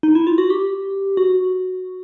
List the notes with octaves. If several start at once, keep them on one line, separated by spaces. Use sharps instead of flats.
D#4
E4
F4
F#4
G4
F#4